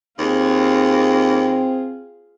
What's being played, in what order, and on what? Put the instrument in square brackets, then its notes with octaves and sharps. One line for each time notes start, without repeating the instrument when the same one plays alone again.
[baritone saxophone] D#2 [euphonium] C4 [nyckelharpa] F4 G#4